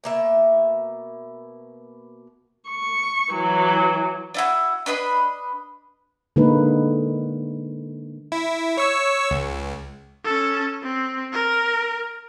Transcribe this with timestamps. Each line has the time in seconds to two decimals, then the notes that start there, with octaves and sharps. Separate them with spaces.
0.04 B2 A#3 E5
2.69 C#6
3.33 E3 F#3
4.34 D4 E4 F#4
4.86 D4 B4 D#5 B5
6.36 D3 G#3 A#3 D#4 B4
8.32 E4
8.77 C#5 C#6 E6
9.31 C#2
10.25 C#4 A4
10.83 C4
11.33 A#4